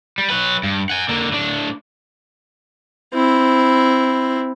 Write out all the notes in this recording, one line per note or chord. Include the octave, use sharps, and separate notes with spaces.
G3
F#3 B4
G2
F#5 G#5
D3 A#3
A2 D4
C4 E4